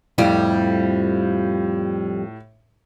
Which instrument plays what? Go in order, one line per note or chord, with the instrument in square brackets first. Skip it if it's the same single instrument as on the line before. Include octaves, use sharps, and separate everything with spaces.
[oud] F2 G3 D5 [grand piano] A2